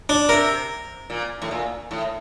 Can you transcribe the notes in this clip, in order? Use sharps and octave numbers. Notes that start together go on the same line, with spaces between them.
D4
C3 A#4
A#2
A2
A#2
A2